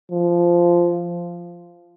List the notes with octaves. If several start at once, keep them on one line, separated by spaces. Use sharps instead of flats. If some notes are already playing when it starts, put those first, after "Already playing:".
F3